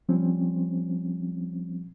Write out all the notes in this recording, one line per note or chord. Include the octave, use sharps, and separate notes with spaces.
F3 G3 C4 C#4